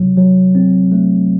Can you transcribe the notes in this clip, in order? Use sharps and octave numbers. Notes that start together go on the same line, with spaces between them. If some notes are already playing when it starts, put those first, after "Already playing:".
Already playing: C3 F#3
F#3
C4
A3